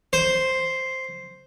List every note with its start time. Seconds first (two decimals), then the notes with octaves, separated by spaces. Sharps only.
0.13 C5